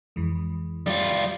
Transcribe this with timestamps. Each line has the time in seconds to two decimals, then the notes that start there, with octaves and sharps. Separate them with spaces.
0.16 F2 E3 G#3
0.87 G3 F4